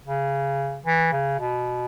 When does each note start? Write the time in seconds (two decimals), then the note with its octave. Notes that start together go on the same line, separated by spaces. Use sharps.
0.05 C#3
0.86 E3
1.12 C#3
1.39 B2